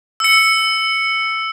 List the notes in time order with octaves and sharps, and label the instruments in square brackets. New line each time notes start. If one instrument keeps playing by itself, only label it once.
[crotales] E6 C#7